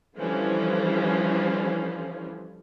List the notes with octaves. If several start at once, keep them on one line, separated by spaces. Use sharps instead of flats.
D3 E3 F3 G3 C#4